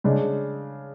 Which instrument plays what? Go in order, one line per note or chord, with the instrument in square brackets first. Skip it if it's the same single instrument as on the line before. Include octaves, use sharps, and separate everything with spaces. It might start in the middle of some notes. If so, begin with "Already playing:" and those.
[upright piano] C#3 G#3 D4